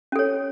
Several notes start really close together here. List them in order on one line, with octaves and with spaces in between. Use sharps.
C#4 A4 C#5